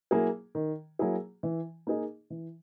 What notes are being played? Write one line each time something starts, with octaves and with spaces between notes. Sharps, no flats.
F#3 A#3 E4 G#4
D#3
F#3 A#3 E4 G#4
E3
A#3 D#4 G#4 D#5
E3